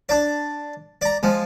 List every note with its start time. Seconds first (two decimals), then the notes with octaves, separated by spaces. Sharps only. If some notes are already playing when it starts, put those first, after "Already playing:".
0.09 D4 D5
1.02 D5 A#5
1.23 F3 G#3